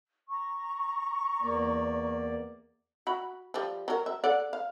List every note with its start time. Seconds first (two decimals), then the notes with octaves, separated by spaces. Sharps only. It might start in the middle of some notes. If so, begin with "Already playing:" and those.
0.28 A#5 C#6
1.42 E2 A#3 D5
3.07 F#4 B5
3.54 F3 G3
3.88 F#3 A#4
4.06 E5
4.24 A4 D5 F#5
4.53 F5